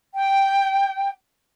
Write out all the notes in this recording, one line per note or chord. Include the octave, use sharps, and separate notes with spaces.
G5